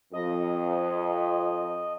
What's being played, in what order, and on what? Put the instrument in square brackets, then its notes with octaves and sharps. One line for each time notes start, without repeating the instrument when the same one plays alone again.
[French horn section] F2 [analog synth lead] D#5